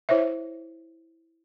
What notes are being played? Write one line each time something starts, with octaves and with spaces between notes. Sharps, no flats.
E4 C5 C#5 E5